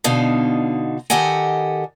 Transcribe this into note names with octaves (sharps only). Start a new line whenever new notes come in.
B2 D3 D#4 F5
D#3 G4 A4 D#5 F#5 G#5